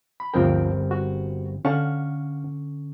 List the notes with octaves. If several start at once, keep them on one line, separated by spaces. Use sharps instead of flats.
B5
G1 D2 F3 C4 A#4 G5
F#4
D3 C#4 F5 F#5 A5 C#6